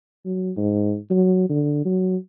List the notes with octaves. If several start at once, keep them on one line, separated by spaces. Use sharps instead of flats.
F#3
G#2
F#3
D3
F#3